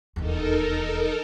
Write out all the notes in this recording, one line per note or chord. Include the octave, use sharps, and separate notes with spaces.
D#1 E2 D#4 A4 A#4